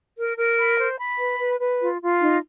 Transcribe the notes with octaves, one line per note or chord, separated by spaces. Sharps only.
A#4
A#4
B5
C5
B5
B4
B4
B4
F4
F4
D#4